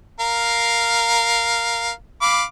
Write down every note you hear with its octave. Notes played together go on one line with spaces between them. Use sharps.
A#4 F5
F5 B5 D6